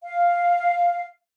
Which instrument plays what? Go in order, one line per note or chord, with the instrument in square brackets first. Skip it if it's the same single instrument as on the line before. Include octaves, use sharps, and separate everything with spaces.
[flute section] F5